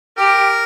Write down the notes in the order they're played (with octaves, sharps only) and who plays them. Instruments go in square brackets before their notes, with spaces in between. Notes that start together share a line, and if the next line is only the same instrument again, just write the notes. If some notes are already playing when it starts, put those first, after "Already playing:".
[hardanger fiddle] G4 [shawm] A#4